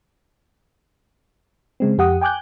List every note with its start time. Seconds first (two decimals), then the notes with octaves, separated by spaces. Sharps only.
1.80 C#3 G#3 C4
1.98 F2 G4 F#5 D#6
2.21 G5 G#5 D6 F#6 G6